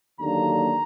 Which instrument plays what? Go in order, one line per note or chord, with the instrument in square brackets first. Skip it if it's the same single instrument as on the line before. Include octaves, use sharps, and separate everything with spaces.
[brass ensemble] D#2 D3 F#3 A#3 D4 A#5